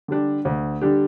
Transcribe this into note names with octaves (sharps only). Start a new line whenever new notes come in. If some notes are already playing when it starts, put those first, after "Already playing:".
D3 G3 D4 G4
D2
D3 G3 D4 G4